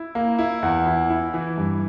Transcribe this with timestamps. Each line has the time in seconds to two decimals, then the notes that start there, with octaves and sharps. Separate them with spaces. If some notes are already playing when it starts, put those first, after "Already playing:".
Already playing: E4
0.15 A#3
0.39 E4
0.63 E2
0.86 E4
1.10 E4
1.34 E3
1.57 G2